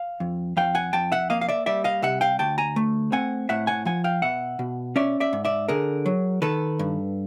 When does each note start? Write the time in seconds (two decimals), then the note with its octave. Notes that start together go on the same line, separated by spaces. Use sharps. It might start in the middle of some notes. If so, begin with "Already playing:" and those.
Already playing: F5
0.20 F2
0.57 F2 F5 G5
0.75 F#5 G#5
0.93 F2 G5 A5
1.12 E5 F#5
1.30 A#3 D#5 F5
1.41 F5
1.49 D5 E5
1.66 G3 D5 E5
1.84 D#5 F5
2.02 C3 E5 F#5
2.21 F5 G5
2.39 D2 G5 A5
2.58 G#5 A#5
2.76 A3
3.12 C4 F#5 G#5
3.49 A2 E5 F#5
3.67 F#5 G#5
3.85 F3 F#5 G#5
4.04 F5 G5
4.22 B2 E5 F#5
4.59 B2
4.96 C#4 D5 E5
5.20 D5 E5
5.33 G#2
5.45 D5 E5
5.68 D3 G#4 A#4
6.06 F#3
6.42 D#3 A4 B4
6.79 G2